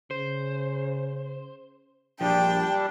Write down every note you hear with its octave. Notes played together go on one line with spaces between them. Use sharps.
C#3 C5
A#1 F3 G3 D4 G5